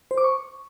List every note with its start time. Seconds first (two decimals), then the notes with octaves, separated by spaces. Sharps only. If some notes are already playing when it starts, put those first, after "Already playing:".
0.11 C5
0.18 D6
0.24 C#6